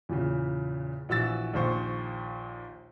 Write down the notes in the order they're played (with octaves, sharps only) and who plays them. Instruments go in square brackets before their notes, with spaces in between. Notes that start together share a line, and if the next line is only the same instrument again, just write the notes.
[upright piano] E2 A#2 C#3
A#1 E3 F#4 E6 A6
A#1 D#2 C5 C#6